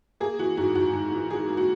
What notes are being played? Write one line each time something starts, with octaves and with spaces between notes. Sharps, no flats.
A#3 G#4
E3 F#4
G#2 F#4
G#2 F#4
G#2
E3
E3 G#4
A#3
F#4